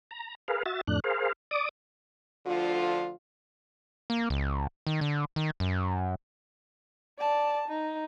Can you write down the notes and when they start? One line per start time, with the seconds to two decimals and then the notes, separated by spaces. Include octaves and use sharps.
0.11 A#5
0.48 G#4 A#4 B4 F5
0.66 F#4 E5 A6
0.87 F2 A2 D4 F#6
1.04 G#4 A#4 C5 F5
1.51 D5 D6 D#6
2.46 D2 D3 F3 F4
4.10 A#3
4.30 C#2
4.87 D#3
5.01 D3
5.36 D#3
5.60 F#2
7.19 D5 A5
7.68 D#4